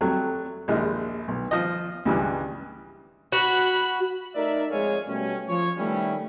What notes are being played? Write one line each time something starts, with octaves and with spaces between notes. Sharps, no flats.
F2 F#3 G3 A3
A#1 D#2 G#3 E4 F6
B1
F3 D#5
C#2 G2 E3
F#4 B5
A3 D#4 A#4 D5 E5
F2 G#3 G#4 C#5 F5 G#5
B2 G3 A3 C#4
F3 C#5
D#3 G3 A3 B3 C#4 E4